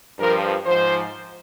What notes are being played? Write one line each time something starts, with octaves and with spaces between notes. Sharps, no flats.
G2 F3 A#4
G#2 F3 C5